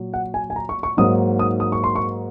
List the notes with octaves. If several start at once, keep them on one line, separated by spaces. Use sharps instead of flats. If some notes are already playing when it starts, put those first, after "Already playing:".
Already playing: A#2 F#3
F#5
G#5
G#5
A#5
C#6
C#6
G#2 F#3 A#3 D#4 D#6
D#6
D#6
C#6
C6
C#6